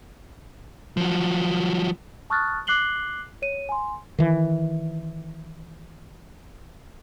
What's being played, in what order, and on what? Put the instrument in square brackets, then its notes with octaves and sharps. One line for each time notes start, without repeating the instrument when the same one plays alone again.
[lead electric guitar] F3 F#3
[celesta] A5 C#6 D#6 F6 F#6 A6
D6 F#6 C7 F#7 G7
C#5 D#7
G#5 C6
[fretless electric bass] D#3 E3